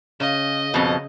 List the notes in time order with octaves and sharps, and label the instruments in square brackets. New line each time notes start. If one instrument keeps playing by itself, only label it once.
[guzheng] C#3 [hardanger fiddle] D#5
[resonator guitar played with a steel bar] F2 B2